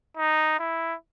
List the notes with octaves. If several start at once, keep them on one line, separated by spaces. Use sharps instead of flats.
D#4
E4